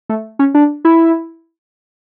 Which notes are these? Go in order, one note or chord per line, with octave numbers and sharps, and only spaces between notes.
A3
C#4
D4
E4